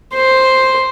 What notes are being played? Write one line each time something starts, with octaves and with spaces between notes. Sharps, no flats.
C5